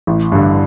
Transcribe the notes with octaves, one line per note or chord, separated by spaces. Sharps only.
A1
G2 D3